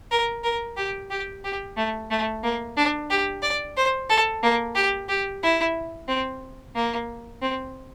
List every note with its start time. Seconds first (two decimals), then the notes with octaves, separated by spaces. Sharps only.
0.11 A#4
0.44 A#4
0.77 G4
1.10 G4
1.44 G4
1.77 A3
2.11 A3
2.43 A#3
2.77 D4
3.10 G4
3.42 D5
3.77 C5
4.09 A4
4.43 A#3
4.75 G4
5.09 G4
5.43 E4
6.08 C4
6.75 A#3
7.42 C4